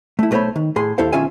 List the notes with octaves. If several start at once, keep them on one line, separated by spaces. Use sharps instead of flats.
A3 E4
B1 A3 A#4 C5 C#5 B5
D#3
A2 G#4 C6
D#2 E4 A4 C5 F5
B1 D#3 C#4 F4 E5 G#5